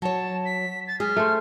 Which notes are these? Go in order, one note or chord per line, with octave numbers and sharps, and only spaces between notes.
F#3 C#5 A5
B6
A6
G#3 G#4 F6
A3 C5